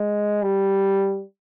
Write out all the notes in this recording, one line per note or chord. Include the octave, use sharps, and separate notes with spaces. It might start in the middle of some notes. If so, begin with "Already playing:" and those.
Already playing: G#3
G3